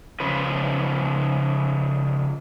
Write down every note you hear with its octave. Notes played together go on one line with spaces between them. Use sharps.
C#3 F3 B4